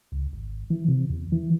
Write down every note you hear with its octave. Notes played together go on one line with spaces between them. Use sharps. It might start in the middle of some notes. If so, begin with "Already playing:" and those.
C#2
G#1
E3
C3
E2
E3